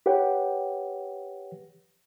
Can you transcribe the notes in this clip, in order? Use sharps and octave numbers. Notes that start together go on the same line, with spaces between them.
G4 B4 C#5 F#5 G5